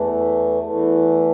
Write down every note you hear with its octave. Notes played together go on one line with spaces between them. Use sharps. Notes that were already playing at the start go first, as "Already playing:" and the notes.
Already playing: E2 E3 A3
E2 E3 A3